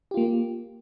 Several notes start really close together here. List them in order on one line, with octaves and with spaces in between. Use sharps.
G4 F4 A#3